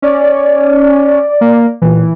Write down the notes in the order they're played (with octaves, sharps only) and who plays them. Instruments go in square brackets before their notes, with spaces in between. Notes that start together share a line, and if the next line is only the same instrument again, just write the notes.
[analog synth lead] C#4 [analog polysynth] D5
[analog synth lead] A#3
[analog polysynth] A#2 [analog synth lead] E3